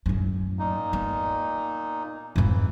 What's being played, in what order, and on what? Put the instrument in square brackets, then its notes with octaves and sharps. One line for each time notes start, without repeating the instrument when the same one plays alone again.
[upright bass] F#2 A2
[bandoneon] A#2 D#4
[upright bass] B3
[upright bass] F2 G#2 [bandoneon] E3